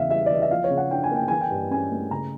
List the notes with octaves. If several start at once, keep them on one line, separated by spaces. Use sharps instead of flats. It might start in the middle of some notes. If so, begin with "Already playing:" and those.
Already playing: E2 C#3 E5 F5
G3 E5
D5
E3 D#5
E5
F3 F5
C#5
C#3
F#5
D4 G5
G#5
A#3
G5
E3 G#5
G5
G2
C#4 G#5
A3
C#3 A#5